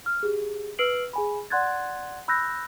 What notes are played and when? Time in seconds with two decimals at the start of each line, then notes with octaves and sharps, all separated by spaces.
0.06 F6
0.23 G4 G#4
0.79 B4 E6 F6 C7 D7 F#7
1.13 G#4 G#5 B5
1.50 D5 F#5 C6 F#6 G#6 A6
2.28 B5 E6 F#6 G6 A#6